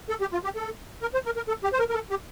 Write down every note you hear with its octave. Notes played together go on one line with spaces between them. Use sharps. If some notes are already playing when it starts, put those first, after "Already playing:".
A4
G4
F4
G4
A4
A#4
C5
A#4
A#4
A4
G4
C5
A#4
A#4
A4
G4